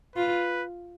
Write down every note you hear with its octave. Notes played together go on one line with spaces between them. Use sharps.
F4 B4